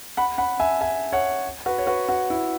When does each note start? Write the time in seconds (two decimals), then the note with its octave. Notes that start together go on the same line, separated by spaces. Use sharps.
0.17 F#5 B5
0.38 F#5 B5
0.60 E5 G#5
0.81 E5 G#5
1.13 C#5 F#5
1.66 F#4 B4
1.78 C#5
1.87 F#4 B4
2.09 F#4
2.30 E4